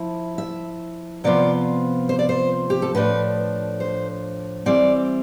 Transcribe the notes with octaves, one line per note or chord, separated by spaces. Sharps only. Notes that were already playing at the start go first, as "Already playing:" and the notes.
Already playing: F3 E4
E5
C3 F3 B3 F4 D5
C5
D5
C5
G4
A4
A2 F3 A3 D4 B4
C5
E3 G3 C4 D5